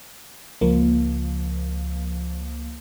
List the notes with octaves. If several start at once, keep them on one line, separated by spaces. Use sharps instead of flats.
C#2 F3 A#3